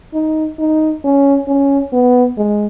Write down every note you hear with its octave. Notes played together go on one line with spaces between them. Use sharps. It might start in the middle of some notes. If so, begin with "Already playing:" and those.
D#4
D#4
C#4
C#4
B3
G#3